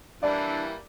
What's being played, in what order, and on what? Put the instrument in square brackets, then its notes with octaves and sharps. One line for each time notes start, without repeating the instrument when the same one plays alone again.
[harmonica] E3 G3 A#3 [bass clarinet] D4 [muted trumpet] E4 [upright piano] D5